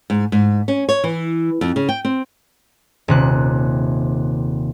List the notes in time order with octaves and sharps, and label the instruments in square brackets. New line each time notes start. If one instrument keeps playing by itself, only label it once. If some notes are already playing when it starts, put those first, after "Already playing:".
[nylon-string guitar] G#2
G#2
C#4
C#5
E3
F2
C#3
G5
C4
[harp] D#1 C3 F#6